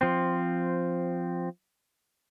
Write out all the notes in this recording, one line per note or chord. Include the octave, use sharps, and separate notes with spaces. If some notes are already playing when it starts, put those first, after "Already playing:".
F3 C4